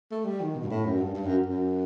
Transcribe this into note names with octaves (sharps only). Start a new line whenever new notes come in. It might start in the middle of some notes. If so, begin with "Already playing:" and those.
A3
G3
D#3
B2
G2
A2
F#2
G2
G2
F#2
F#2